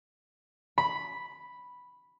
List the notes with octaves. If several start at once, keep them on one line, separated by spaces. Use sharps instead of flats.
B5